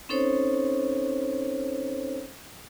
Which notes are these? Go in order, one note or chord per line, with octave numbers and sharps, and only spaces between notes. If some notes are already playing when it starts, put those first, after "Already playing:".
C4 C#4 D#4 A4 C5 C#5